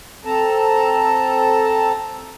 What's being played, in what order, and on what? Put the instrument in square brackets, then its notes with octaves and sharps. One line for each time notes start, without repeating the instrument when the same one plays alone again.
[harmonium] C4 A4 A5 A#5